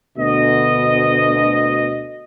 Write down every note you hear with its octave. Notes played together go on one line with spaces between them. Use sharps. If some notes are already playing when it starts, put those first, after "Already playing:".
D2 B2 D#5